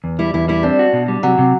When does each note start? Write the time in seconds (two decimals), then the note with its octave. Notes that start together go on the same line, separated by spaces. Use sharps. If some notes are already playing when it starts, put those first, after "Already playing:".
0.04 E2
0.19 G3 E4
0.34 E2 E4
0.48 G3 E4
0.63 C4 D4
0.79 F#4
0.93 B2
1.08 G3
1.23 C3 F#3
1.38 C3